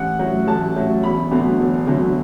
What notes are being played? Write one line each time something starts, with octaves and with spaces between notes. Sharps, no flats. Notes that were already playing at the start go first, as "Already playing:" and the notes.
Already playing: A1 F#5
A2 F#3
A1 A5
A2 F#3
E1 B5
D2 D3 F#3 B3
E1
D2 D3 F#3 B3